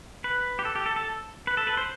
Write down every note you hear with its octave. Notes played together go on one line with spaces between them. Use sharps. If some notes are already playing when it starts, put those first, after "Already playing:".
B4
G4
A4
G4
A4
A4
B4
A4
B4
C5